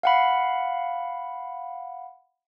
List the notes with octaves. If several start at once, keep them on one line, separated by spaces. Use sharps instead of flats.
F5 F#5 B5